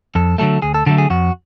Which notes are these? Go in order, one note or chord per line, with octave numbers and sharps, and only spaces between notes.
F2 A4
D3 F#3 A3 A4
D2 G#4
A4
D3 F#3 A3 A4
G#4
F2 F#4